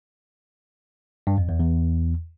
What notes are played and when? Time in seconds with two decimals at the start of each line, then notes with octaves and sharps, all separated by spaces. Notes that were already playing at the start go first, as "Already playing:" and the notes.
1.27 G2
1.38 F2
1.49 E2
1.60 E2